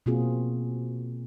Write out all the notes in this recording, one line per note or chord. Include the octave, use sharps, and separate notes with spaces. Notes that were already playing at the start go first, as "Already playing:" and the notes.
B2 A#3 C4 F4 F#4 G#4